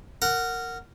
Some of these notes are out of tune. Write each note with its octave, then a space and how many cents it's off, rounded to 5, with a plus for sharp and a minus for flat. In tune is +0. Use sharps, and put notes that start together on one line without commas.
A#4 -15 F#5 +0